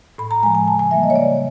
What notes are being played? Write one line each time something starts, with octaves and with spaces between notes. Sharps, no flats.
A2 B5
A#5
F3 G#3 G#5
G#5
C#3 A5
G#5
E3 G3 A#3 E5
D#5
C#5
C#3 D5